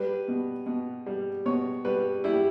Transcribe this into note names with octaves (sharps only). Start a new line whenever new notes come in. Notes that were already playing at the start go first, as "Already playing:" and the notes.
Already playing: G3 B4
B2
B2
G3
B2 C#5
G3 B4
G3 E4
G4